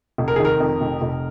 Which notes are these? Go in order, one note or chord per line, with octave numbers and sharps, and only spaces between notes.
F1
A#4
D#3 G#4
A#4
F2
F1
F1